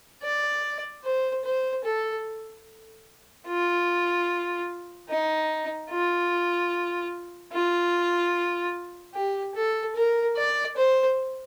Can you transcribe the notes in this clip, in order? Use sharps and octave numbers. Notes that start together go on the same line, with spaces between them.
D5
C5
C5
A4
F4
D#4
F4
F4
G4
A4
A#4
D5
C5